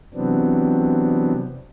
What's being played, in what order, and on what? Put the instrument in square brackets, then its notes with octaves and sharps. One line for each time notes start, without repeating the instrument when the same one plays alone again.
[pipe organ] C3 E3 F#3 B3 C4 D4